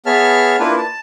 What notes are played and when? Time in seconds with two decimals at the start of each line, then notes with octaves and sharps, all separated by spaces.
0.06 B3 G#4 C#5 E5 A5 F6
0.60 A#3 D4 E4 F4 B4
0.78 A5